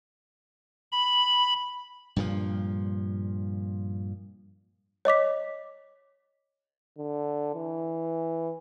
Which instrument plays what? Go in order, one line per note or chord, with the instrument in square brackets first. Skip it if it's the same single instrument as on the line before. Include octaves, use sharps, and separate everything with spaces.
[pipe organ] B5
[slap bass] G2 A#2 F3
[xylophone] C#5 D#5 D6 B6
[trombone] D3
E3